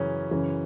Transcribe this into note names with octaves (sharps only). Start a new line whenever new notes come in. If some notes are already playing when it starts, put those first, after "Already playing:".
Already playing: F#2 C#3 E3 C#4
F#2 C#3 E3